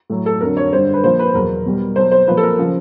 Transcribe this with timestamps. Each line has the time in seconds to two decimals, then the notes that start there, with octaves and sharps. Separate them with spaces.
0.10 A2 F#3
0.26 A4
0.41 F2 D3 F#3 A#4
0.57 C#5
0.72 G2 D3 G3 C5
0.94 B4
1.04 A#2 F3 C5
1.19 B4
1.34 E2 B2 F#3 A#4
1.65 B2 G3
1.96 B2 F#3 C5
2.11 C5
2.27 A#2 F3 B4
2.37 A4
2.43 A#4
2.59 C#3 F3